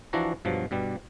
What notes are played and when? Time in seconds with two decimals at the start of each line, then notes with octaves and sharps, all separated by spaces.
0.13 E3 F3 D4 E4 F#4 A#5
0.45 G2 B2 F3 F#3
0.71 G2 B2 G3